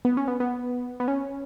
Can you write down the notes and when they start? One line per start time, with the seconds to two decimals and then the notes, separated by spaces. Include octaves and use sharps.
0.05 B3
0.17 C#4
0.28 B3
0.40 B3
1.00 B3
1.08 C#4